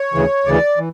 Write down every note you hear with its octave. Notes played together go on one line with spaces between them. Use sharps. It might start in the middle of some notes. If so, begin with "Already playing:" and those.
Already playing: C#5
D2 C#3 E3
D2 C#3 E3 D5
E3